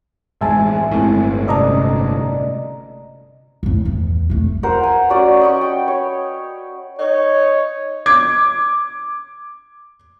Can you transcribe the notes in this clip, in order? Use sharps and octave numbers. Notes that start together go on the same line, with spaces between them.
A1 G#3 E5 G#5 A5
G1 A2 G#3 C4 E4
C3 C#4 D5 D#5 A5 A#5
D1 A2
E2
F2 A3
F4 A#4 C5 F#5
G#5
C#4 F#4 D5
D#5 B5 C#6
G5
C#5
D#4 C#5
D6 G#6